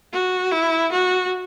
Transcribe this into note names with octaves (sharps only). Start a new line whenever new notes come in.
F#4
E4
F#4